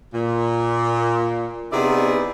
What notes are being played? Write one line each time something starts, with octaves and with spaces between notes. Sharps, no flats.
A#2
C3 B3 D#4 E4 G#4 D5